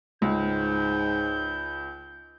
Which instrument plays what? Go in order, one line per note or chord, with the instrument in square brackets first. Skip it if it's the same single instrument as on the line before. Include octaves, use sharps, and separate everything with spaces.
[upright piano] C#2 [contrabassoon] G#2 [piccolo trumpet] G6